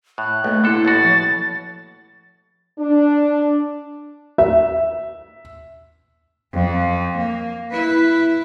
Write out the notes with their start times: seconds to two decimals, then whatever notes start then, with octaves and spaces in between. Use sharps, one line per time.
0.18 A2 F#6
0.44 B1 A3 A#3
0.64 D3 A#3 E4 A4
0.85 A1 B2 F#4 A6
1.04 F3
2.79 D4
4.38 E5
6.53 F2
7.18 A#3
7.72 E4 B4